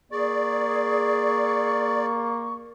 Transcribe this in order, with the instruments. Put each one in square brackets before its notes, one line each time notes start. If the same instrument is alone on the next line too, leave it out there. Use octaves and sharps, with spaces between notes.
[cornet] A#3 [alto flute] G#4 [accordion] D5 [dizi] C#6